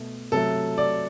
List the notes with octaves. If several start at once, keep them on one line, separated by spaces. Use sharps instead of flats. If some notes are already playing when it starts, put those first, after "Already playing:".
Already playing: B2 A3
C3 F#3 A3 A4
D5